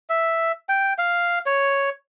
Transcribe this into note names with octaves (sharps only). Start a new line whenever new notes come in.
E5
G5
F5
C#5